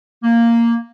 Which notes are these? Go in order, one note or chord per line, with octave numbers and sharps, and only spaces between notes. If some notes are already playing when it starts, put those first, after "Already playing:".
A#3